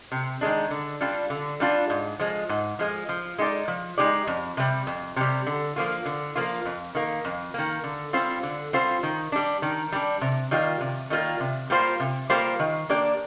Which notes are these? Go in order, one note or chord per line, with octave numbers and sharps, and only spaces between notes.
C3
D#3 G#3 D4
D3
G3 D4 F4
D3
G3 D4 F4
G#2
F3 G#3
G#2
F3 G#3
F3
G#3 D#4 G4 D5
F3
G#3 D#4 G4 D5
F2
C3 G3
F2
C3 G3
D3
F3 A#3 F4
D3
F3 A#3 F4
F2
D#3 A#3
F2
D#3 A#3
D3
G3 C4 F4 C5
D3
G3 C4 F4 C5
D#3
G3 D4
D#3
G3 D4
C3
D#3 G3 A#3 F4
C3
D#3 G3 A#3 F4
C3
G3 A#3 F4 C5
C3
G3 A#3 F4 C5
D#3
A#3 D4 G4 D5